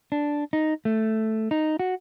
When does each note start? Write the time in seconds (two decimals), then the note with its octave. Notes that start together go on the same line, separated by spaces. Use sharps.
0.12 D4
0.53 D#4
0.85 A3
1.51 D#4
1.79 F#4